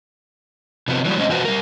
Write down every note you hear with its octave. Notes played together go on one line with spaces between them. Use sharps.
C3 F3 B3
E3 F#3 G3
G#3 C4 C#4 D#5
E3 F3 F#4 B4 C5
G3 A#4